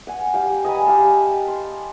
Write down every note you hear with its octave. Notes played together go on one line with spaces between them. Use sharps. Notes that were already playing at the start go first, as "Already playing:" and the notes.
F#5 G#5
G3 F5 G5
D#5 G#5 A#5 B5
G4 F5 A5
C6